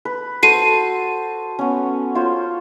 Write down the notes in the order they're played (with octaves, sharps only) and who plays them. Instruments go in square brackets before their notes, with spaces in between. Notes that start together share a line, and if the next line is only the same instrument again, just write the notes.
[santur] B4
[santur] F#4 A4 C5 [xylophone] C7 D#7
[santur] B3 C#4
F4 C5 C#5